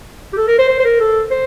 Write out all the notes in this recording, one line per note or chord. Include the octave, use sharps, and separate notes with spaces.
G4
A4
A#4
C5
C5
C5
A#4
A4
C5